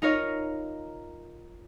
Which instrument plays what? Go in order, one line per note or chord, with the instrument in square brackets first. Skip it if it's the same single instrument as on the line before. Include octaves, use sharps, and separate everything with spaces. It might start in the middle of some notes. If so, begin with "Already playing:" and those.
[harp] D#4 F4 A#4 C#5 D#5 F5